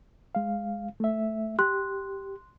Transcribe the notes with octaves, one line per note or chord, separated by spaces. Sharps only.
G#3 F5
A3 E5
G4 C6 F#6